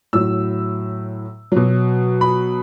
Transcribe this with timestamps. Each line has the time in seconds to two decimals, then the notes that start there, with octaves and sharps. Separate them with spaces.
0.13 A2 F#3 E6
1.52 B2 F#3
2.21 B5